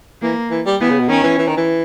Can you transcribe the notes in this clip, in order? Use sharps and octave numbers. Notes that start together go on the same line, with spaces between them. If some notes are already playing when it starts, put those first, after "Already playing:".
E3 A#3
E3
G3
E3 B3
C#3
B2
D#3 C#4
E3
E3
D#3
E3